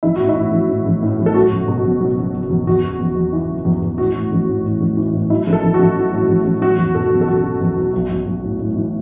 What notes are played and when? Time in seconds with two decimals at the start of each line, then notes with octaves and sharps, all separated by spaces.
0.03 A1 E4
0.16 A2 F#4
0.29 E4
0.35 A2
0.52 A1
0.70 A2
0.86 A1
1.03 A2
1.19 A1
1.26 A4
1.34 F#3 F#4
1.52 F#1
1.68 B2
1.84 F#1
2.01 F#3
2.17 F#1
2.34 F#1
2.50 E2
2.67 E2 F#4
2.84 F#1
3.00 E2
3.16 E2
3.33 E3
3.49 F#1
3.65 E2
3.82 E2
3.98 A2 F#4
4.15 A2
4.32 A1
4.48 A2
4.65 A2
4.80 A1
4.97 E3
5.14 A2
5.30 F#3 E4
5.47 A1
5.53 A4
5.63 A1
5.74 F#4
5.80 A1
5.97 F#3
6.13 A2
6.29 A1
6.45 A1
6.61 F#3 F#4
6.78 E2
6.95 B2 A4
7.11 F#1
7.21 A4
7.28 F#1 F#4
7.44 B2
7.61 E2
7.78 F#3
7.93 B1
8.10 B1
8.27 B1
8.43 A2
8.59 A2
8.76 E3